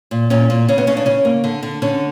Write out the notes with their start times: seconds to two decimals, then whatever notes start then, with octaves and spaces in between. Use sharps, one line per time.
0.11 A#2
0.30 A#2 C#4
0.50 A#2
0.68 C#3 C#4
0.78 B3
0.87 C#3 C#4
0.97 D4
1.06 C#3 C#4
1.25 A#3
1.44 D3
1.63 D3
1.82 D3 C#4